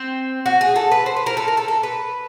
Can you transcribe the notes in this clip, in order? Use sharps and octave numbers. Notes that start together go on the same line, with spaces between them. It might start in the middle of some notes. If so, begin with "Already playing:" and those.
Already playing: C4
F#4
G#4
A4
B4
C5
B4
A#4
A4
A#4
A4
A4
B4